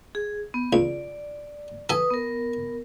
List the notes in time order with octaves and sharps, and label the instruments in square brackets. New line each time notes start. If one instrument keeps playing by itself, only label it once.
[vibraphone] G#4
B3
[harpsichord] C#2 [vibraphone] D5
[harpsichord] A4 G#5 [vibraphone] B4 D#6
[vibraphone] B3 A#4